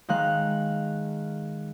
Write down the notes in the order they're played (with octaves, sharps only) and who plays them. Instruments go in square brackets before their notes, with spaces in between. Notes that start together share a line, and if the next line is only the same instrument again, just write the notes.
[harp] D#3 G#3 F5 F#6